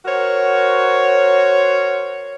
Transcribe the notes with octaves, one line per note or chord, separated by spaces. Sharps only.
F#4 A#4 C5 C#5